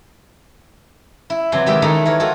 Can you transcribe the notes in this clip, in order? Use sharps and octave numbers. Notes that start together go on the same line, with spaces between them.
E4
C3 E3 F#3 G#5 C6
D#3 G#3 G4 B4 D5 E5
D#3 A3 D#4 E4 G4 A4
E3 A#4 C#5
F4 F#4 A4